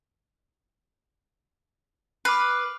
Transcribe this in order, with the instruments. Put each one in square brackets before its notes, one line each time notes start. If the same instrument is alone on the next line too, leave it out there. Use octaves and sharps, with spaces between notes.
[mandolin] B4 [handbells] D6 F6 C7